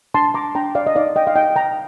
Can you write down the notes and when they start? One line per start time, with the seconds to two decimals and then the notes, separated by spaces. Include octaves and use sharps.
0.14 D4 A5 C6
0.34 A#5 D6
0.55 D4 G5 A#5
0.75 D5 F5
0.87 D#5
0.95 D#4 D5 F5
1.16 D#5 G5
1.27 F5
1.36 D#4 D#5 G5
1.56 G5 A#5